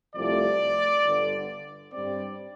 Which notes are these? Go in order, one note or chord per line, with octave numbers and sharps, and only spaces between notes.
C2 C3 F3 A3 D5
G1 G2 D3
G2 G3 C4 D5